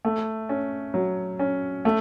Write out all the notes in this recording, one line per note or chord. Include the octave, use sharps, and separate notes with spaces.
A3
C#4
F#3
C#4
A3